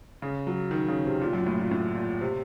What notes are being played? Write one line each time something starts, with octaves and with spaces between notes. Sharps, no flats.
C#3
F#3
D#3
C#3
C3
A#2
F#2
A2
A#2
A2
A#2
C3